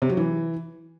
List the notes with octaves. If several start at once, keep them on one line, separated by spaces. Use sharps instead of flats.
C3
F#3
E3